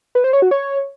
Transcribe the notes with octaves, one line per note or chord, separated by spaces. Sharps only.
B4
C5
C#5
F#4
C#5